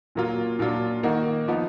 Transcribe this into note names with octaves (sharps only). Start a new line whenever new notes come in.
A#2 F#3 A#3 F4
A#2 F#3 D4 F4
D#3 A#3 D#4 F#4
F3 B3 D#4